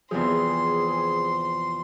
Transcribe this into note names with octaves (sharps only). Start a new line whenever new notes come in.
E2 C3 F3 G#4 C6